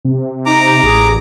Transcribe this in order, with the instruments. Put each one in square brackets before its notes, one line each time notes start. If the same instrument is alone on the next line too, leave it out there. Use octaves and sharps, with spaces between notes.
[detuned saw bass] C3
[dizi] D#4 [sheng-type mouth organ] A#5 D6
[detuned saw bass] A1 [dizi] G#4